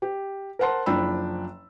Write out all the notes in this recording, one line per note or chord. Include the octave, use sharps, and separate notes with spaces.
G4
A#4 C5 F#5 A5 C6
F#1 F3 D4 G5 B5 E6